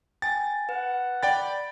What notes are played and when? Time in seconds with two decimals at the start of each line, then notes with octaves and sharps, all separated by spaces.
0.22 G5 G#5 A6
0.69 B4 F#5
1.23 D5 G5 B5 A6